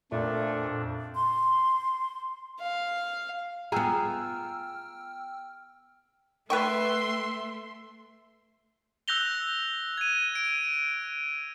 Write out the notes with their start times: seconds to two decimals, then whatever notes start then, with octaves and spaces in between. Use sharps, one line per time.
0.12 F2 A#2 A3 D4
1.14 C6
2.61 F5
3.72 B3 F4 G#4 G5 G#5 A#5 E6 F6
6.50 A3 B4 E5 G5 C6 C#6
9.08 E6 F#6 G6 A#6 F7 G7
9.98 G#6 D#7
10.35 D7